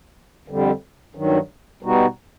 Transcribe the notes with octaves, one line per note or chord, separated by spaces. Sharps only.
F2 D3 G3
G2 D#3 F#3
B2 G3 B3 D#4 F#4